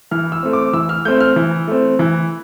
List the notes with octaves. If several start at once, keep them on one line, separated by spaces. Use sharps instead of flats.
E3 F6
E6
A3 C4
D6
E3 E6
F6
A3 C4 G6
F6
E3
A3 C4
E3